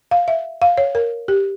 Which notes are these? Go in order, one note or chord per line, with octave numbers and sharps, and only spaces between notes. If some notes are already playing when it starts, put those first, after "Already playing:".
F5
E5
F5
C#5
A#4
G4